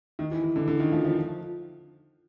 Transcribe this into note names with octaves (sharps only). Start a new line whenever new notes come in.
D#3
E3
E3
D3
D3
D#3
F3
F3